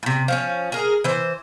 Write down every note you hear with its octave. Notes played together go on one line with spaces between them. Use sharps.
A2 C3
F3 C4 C#4
G#4 A#4
E3 C5